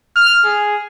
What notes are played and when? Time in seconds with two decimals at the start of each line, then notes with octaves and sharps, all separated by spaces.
0.16 F6
0.45 G#4